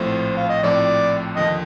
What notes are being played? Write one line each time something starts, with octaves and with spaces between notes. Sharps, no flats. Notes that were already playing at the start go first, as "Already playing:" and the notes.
Already playing: A#1 A2 F3 A3 C4 C5
F5
D#5
A#1 A2 F3 A3 C4 D5
D#2 D3 F3 D#5